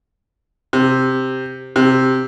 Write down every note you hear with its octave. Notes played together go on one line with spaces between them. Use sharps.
C3
C3